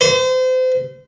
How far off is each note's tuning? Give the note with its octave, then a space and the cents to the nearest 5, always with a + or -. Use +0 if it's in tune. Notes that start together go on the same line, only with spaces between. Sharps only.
C5 -35